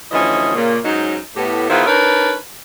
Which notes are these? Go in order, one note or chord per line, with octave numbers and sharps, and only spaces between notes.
D2 E3 F3 C#4 D#5
A#2 C#3 A#3
G#2 F#3 C#4 D#4
A2 B3 G4
D#3 B3 E4 F4 G#4 C5
D4 D#4 A#4 B4 C#5